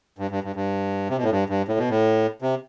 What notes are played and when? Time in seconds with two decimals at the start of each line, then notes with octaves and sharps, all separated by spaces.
0.19 G2
0.31 G2
0.44 G2
0.56 G2
1.10 C3
1.17 B2
1.23 A2
1.31 G2
1.49 G2
1.68 A2
1.78 B2
1.89 A2
2.42 C3